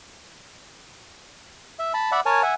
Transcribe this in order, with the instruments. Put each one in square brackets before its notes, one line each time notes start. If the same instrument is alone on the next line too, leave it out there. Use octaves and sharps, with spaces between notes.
[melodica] E5
A5 B5
D5 E5 F#5 B5
A#4 C#5 G#5 A5
E5 F#5 G#5